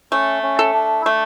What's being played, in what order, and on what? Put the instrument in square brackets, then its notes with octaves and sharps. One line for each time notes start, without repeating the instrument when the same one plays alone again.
[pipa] A3 [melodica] C#4
[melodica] C#4
[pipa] A4
[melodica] D4
E4
[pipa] A3 [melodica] D4